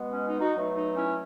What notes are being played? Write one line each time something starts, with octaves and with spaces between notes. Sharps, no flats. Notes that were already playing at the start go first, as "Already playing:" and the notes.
Already playing: B2 G#3 B3
C#4
D#4
D#4 F#4
B2 F#3 A3
D#4
C#4 E4